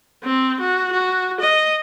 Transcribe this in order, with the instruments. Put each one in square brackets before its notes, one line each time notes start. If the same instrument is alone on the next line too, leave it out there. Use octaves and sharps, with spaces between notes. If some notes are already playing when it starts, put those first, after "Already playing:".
[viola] C4
F#4
F#4
D#5